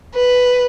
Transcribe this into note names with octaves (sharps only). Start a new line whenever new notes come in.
B4